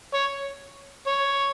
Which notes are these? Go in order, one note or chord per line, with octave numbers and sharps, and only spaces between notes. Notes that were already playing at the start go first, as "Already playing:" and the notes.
C#5
C#5